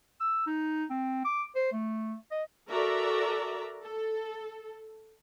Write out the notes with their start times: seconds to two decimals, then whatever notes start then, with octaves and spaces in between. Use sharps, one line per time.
0.20 E6
0.47 D#4
0.90 C4
1.24 D6
1.55 C5
1.72 A3
2.31 D#5
2.69 F#4 A4 A#4 D5 E5 A#5
3.82 A4